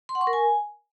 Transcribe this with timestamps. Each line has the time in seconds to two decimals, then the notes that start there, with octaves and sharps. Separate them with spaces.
0.09 C6
0.15 F#5
0.21 C#6
0.27 A#4
0.33 G#5